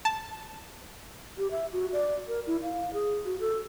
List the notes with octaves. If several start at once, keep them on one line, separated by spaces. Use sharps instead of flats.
A5
G4
E5
F#4
D5
A#4
E4
F5
G#4
F#4
A4